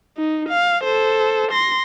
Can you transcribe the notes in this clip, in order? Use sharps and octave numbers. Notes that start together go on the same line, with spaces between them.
D#4
F5
A4 C5
C6 A#6